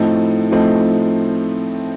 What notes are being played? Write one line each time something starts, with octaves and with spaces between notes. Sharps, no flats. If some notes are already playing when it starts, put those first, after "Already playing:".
Already playing: A2 F3 A3 C4 D#4
A2 F3 A3 C4 D#4